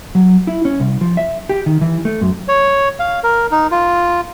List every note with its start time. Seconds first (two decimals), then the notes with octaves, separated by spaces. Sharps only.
0.15 F#3
0.47 E4
0.65 C#4
0.80 C2
1.01 F3
1.17 E5
1.49 G4
1.66 D#3
1.81 E3
2.05 A3
2.21 F#2
2.48 C#5
2.99 F5
3.23 A#4
3.51 D#4
3.71 F4